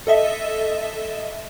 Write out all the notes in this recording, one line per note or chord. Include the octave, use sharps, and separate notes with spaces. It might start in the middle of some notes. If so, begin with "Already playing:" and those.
A4 D#5 E5